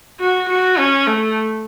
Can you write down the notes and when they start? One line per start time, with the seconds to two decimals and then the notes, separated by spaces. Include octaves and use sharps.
0.20 F#4
0.49 F#4
0.78 C#4
1.07 A3